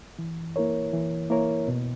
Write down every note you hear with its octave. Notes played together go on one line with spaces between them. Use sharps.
E3
A#3 E4 A#4 C#5
E3
A#3 E4 A#4 C#5
B2